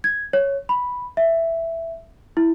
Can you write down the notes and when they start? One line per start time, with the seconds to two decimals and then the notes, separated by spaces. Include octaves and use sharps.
0.04 G#6
0.33 C#5
0.69 B5
1.17 E5
2.37 E4